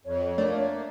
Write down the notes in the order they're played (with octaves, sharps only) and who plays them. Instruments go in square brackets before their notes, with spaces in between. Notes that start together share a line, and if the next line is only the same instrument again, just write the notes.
[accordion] F2 [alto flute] C#5
[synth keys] A3 [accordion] A#3 [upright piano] D4